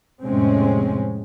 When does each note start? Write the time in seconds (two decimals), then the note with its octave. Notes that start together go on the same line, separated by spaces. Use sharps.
0.23 F2 A2 C3 G#3 C4 C#4